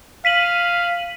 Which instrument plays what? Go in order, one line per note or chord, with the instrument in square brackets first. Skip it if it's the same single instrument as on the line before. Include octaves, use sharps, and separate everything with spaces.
[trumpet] F5 [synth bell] B6 D#7 F#7